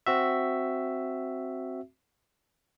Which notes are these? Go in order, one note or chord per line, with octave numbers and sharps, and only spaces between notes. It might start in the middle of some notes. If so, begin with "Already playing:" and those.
C4 F#4 E5